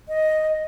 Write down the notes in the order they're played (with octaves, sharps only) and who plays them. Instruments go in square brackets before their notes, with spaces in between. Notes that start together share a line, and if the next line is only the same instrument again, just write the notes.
[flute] D#5